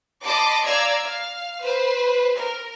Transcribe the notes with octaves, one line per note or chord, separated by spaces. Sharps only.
D#5 A5 B5 C6 D6
D5 F5 A#5 E6 G#6
F5
B4 C5
A#4